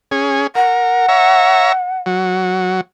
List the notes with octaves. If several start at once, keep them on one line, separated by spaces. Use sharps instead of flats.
C#4 G#4
A#4 F#5
C#5 E5 A#5
F#3